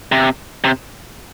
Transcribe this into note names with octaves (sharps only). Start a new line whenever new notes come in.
C3
C3